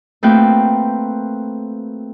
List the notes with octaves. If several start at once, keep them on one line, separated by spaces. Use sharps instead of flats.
A3 A#3 C4 F#4 B4 G5